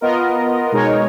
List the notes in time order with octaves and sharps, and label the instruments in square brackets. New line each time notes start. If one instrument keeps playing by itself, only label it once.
[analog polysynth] B3 F4 A#4 D#5
B2 G#3 D#4 A#4 C#5